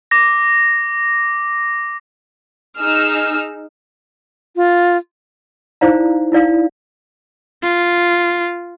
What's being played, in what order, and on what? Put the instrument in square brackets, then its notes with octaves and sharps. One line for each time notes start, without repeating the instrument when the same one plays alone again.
[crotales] D6 A#6
[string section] D#4 G#4 E6 F6
[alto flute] F4
[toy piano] D#4 E4 C5 D5 F5 A#5
D#4 E4 D5 F5
[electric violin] F4